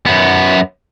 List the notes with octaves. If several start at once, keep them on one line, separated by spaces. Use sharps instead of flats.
F#2 B3